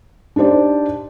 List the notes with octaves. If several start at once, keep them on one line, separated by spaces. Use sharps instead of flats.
D4 D#4 G4 C5 D5